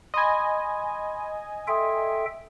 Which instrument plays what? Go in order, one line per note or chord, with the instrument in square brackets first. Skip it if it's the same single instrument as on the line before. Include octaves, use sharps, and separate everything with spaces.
[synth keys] D#5 G#5 [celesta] B5 C6
[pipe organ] A4 E5 G5 [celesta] C6 D#6